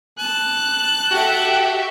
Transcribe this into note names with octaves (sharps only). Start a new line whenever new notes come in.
A5 F#6
F#4 G4 A4 E5